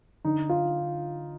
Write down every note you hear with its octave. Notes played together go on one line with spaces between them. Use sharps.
D3 D#4
F4